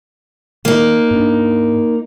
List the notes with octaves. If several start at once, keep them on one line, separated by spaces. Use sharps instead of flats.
D#3 A#3 D#4
G#2 D4